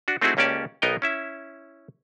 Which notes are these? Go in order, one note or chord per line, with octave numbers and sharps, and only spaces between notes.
D4 F#4
A3 C4 D#4 E4 F#4 G#4
C#2 A#3 C#4 G4 D5 A5
B1 B3 D#4 A#4 D#5 G5
C#4 E4 E5